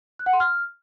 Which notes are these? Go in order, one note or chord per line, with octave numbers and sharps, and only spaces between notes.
F#6
F#5
C6
F6